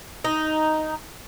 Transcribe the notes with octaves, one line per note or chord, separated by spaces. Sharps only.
D#4